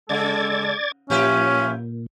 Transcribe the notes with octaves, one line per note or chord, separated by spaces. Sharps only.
C#3 G#3 A4 D5 G#6 A6
A#2 F3 C#4 F4 G4 B4 C#5 E5